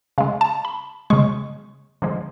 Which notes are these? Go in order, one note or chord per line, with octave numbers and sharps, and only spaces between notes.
C#3 G#3 F5
A5
B5
C#3 G#3 C#6
D3 F3 G#3